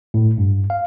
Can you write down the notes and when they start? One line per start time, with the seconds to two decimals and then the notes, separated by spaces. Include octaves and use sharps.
0.14 A2
0.38 G2
0.70 F5